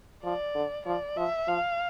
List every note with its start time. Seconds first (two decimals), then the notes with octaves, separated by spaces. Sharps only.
0.24 F3 D5
0.55 D3
0.86 F3 D5
1.17 F3 E5
1.48 F3 F5